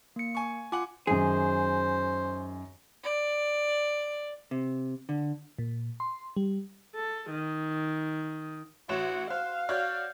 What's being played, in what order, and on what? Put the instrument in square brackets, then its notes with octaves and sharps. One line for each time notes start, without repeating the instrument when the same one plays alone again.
[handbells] A#3 C#7
[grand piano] G#5 C#6
[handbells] F4 D6 [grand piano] F#5 G#5
[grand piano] F#2 D#3 [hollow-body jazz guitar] G#4 [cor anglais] C5
[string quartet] D5
[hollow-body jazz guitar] C3
D3
[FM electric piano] A#2
C6
G3
[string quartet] A4
D#3
[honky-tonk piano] A1 C#5 E7 [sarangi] F#4
[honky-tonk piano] C5 [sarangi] F5 [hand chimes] F#6
[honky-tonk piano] F#4 C#5 D5 [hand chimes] F6 G6